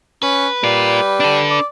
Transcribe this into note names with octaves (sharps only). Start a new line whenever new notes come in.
C#4 B4
G3 F4 A#4
D4 A4
D5